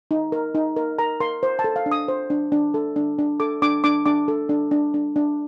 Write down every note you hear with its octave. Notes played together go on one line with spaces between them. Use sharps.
D#4
A#4
D#4
A#4
A#4 A#5
A#4 C6
C5
A5
A4
F5
D4
D#6
C5
D4
D4
A4
D4
D4
A4 D6
D4 D6
D4 D6
D4 D6
A4
D4
D4
D4
D4